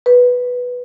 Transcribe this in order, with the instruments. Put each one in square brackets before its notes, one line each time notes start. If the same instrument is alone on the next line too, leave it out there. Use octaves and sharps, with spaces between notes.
[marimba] B4